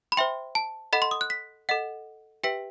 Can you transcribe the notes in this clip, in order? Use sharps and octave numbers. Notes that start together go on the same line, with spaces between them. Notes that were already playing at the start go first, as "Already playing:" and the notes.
B5
C5 E5 G5 C6
A5
A4 D#5 F#5 B5
C6
D#6
F#6
B6
A4 D#5 F#5
G4 B4 E5 G5 B6